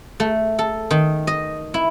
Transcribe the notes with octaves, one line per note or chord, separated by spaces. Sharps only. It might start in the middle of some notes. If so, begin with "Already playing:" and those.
A3
A4
D#3
D#5
E4